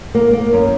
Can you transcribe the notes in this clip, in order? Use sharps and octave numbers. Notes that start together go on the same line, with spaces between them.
A#3
A#3
F#2